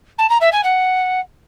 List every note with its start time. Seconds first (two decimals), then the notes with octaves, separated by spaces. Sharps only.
0.18 A5
0.29 A#5
0.41 E5
0.52 G#5
0.63 F#5